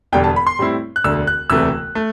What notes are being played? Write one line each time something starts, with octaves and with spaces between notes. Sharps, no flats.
E1 E2 D3 G3 G5
A5
B5
C6
A2 G3 C4 E4
F#6
E1 D2 D3 E6
F#6
E1 D2 C3 E3 A3 E6
A3